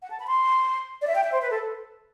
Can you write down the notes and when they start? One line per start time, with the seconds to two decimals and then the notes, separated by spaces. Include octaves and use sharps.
0.02 F#5
0.10 A5
0.20 B5
0.27 C6
1.02 D5
1.07 E5
1.15 G5
1.24 E5
1.32 C5
1.42 B4
1.50 A4